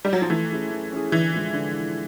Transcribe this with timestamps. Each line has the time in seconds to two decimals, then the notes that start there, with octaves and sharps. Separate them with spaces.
0.05 G3
0.13 F#3
0.22 F3
0.30 E3 A3
0.50 C#4 E4 G#4
0.71 A3
0.92 C#4 E4 G#4
1.12 D3 E3
1.33 F3 G#3
1.54 D3